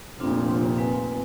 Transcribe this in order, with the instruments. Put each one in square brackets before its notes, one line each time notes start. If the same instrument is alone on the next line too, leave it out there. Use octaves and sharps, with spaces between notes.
[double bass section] F1 A#2 [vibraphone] C4 D4 F4
[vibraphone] C4 B4 G#5